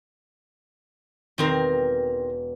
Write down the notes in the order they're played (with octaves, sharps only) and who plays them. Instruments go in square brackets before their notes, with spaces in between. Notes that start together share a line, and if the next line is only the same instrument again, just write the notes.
[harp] E1 [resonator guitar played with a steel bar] D#3 C4 A#4